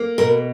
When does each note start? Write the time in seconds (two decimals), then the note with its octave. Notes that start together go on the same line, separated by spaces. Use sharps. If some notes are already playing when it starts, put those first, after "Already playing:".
Already playing: A#3
0.18 B2 A#4